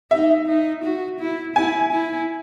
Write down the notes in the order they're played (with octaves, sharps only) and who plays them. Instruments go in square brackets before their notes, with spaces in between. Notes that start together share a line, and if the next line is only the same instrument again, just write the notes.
[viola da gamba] D#4 [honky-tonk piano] E5
[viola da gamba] D#4
F#4
E4
[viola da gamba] E4 [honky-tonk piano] G#5
[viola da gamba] E4